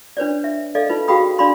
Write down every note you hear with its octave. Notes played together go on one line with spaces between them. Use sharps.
D4 B4 C#5 D5
E5
A4 D5 D#5 F5
D#4 F4 B4
F#4 G#4 F5 G5 B5 D#6
D4 D5 F5 B5 C6